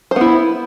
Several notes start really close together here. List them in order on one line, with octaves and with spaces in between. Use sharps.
C5 B3 E4